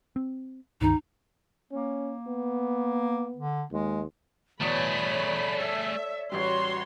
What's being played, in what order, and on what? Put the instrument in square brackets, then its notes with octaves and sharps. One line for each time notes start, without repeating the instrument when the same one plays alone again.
[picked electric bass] C4
[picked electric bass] C#2 G2 D#3 [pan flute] D#4
[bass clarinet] A#3 [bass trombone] C#4
[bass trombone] B3
[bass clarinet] D3
[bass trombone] D#2 [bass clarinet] G#3
[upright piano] E2 B2 D7 [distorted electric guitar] A3 G#4 [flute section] C#5 D5 [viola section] B5
[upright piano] A4 [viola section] E5
[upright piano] A1 G3 [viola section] F#4 C#5 C6